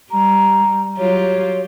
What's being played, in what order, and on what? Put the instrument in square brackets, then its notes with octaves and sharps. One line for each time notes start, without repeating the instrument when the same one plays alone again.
[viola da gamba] G3 [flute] A#5
[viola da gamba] F#3 F4 G4 [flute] C#5